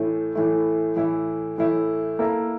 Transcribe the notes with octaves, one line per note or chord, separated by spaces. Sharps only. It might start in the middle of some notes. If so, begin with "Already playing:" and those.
Already playing: A2 E3 A3 E4
A2 E3 A3 E4
A2 E3 A3 E4
A2 E3 A3 E4
A#3 E4 A4